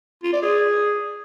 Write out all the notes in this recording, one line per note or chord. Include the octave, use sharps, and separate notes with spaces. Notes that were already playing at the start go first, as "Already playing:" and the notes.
F4
D5
G#4